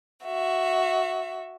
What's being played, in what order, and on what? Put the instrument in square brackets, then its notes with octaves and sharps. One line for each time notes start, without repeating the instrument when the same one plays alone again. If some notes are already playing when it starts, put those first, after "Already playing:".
[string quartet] F#4 E5